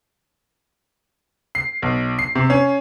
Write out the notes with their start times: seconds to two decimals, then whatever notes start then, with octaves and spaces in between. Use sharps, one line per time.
1.55 C7
1.82 B1
2.19 C7
2.35 C3
2.50 C#4